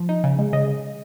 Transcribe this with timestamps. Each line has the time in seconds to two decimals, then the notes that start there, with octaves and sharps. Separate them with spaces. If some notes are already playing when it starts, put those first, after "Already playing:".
Already playing: F3
0.09 D#4
0.24 C#3
0.39 G#3
0.53 C#3 D#5